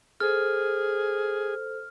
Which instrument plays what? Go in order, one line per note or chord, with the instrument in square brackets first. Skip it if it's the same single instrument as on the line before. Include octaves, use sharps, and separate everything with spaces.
[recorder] G#4 [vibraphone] A4 C5 [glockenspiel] F6